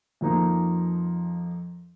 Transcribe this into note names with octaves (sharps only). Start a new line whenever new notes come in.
F2 F3 A#3 D#4